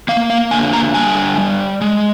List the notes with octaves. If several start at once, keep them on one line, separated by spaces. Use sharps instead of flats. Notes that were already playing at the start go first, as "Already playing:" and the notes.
A#3 F5
F5
D3 G#5
A#5
G3 G#5
G3
G#3